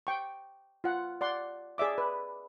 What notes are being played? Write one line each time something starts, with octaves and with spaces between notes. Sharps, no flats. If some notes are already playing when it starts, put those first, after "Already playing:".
G5 C#6
F4 F#5
D5 F#5 C6
G#4 D5 E5 D6
B4